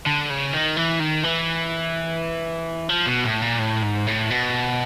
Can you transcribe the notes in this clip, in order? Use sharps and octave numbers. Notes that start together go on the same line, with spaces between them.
D3
C#3
D#3
E3
D#3
E3
F3
B2
A2
A#2
A2
G#2
A2
B2